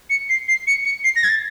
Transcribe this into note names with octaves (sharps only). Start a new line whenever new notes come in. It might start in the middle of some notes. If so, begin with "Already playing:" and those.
C#7
C7
C7
C#7
C#7
C7
A#6
G#6
A6